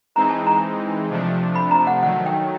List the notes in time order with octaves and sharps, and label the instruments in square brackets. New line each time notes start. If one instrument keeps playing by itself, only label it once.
[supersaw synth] E3 G#3 C4 D#4 [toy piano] A#5
[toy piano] A5
A#5
[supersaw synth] C3 F3 A3 D4
[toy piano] B5
A#5
F#5
[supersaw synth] D#3 F#3 A3 [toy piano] F#5
[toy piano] G5